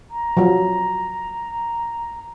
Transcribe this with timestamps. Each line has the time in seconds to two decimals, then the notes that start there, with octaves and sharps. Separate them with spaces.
0.11 A#5
0.37 F3 F#3